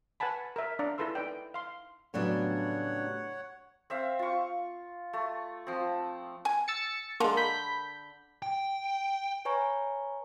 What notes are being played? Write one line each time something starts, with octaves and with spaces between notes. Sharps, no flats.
B4 F#5 G#5 A5 B5
A#4 E5
D4 D5 F5 A#5
E4 G#4 A4 B4 C6 E6
D#4 B4 D5 G5
F5 C6
A2 C#3 F#3 G3 B3 D4 C#5 F#5
C4 E5 F5
F4 C#6
A3
F3 C4
G#5
E6 A6 C#7
D3 G#3 A#3 A#5 C6
B5 G6 B6
G5
B4 C#5 G#5 A#5 C#6